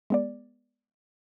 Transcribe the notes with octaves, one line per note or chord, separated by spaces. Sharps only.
G#3 B3 D5